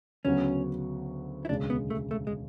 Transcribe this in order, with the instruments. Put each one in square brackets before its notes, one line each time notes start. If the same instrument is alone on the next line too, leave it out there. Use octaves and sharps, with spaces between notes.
[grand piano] D2 C#3 F#3 B3 F#4 [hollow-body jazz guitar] C#4
[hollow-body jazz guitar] E4
[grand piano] E1 D2 C#3 G#3 [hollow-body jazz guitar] D4
[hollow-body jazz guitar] B3
A3
A3
G#3